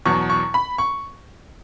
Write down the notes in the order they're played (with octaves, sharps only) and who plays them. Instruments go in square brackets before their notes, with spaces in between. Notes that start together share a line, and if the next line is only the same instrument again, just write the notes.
[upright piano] E2 B2 F#3 C#6
C#6
B5
C#6